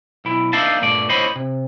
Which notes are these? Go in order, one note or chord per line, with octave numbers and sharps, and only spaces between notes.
B1 E4
A#3 D4 D#4 E5 F5 A5
G2 A#2 A3 D5
A2 D3 C5 C#5 D#5 B5
C3